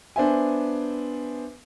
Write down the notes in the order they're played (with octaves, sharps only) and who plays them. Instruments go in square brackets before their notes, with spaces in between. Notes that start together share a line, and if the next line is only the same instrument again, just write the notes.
[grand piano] B3 D4 C5 E5 G#5